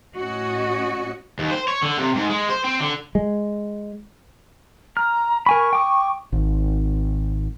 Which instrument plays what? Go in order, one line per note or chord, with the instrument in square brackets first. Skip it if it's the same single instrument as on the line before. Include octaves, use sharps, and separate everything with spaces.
[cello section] A2 C#4 F#4 D#5
[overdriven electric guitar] D#2
C5
C#5
D3
C3
G#2
G#3
C5
C4
D3
[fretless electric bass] G#3
[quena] A#5 [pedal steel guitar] F6
[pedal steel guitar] A#4 G#5 B5 [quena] C#6
[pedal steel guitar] G5 D6 D#6
[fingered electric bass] G#1